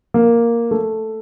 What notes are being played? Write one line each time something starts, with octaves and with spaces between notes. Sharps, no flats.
A#3
A3